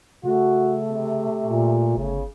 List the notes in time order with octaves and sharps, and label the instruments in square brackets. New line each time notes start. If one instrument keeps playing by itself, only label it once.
[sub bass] C#3 [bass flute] A3 [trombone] F#4
[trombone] C3
[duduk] A#2
[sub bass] G1 [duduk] C#3